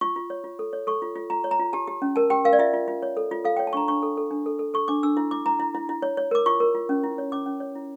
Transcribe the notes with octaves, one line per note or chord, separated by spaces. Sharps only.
F4 C#6
F4
C#5
F4
A4
C#5
A4 C#6
F4
F4
F4 A#5
C#5
A#5
F4
G4 A5
G4
C#4
A#4 A5
G4 G5
A#4 F5
D5
F4 E5
F4
F4
C#5
A4
F4
A4 F5
G5
C#5
A5
D4 A#5 C#6
D4 C#6
A4
A4
D4
A4
A4
A4 C#6
D4 D6
D4 E6
E4
E4 D6
E4 A#5
E4
E4
E4
C#5
C#5
A#4 D6
F4 C#6
A#4
F4
C#4
E4
C#5
C#4 D6
C#4
C#5
E4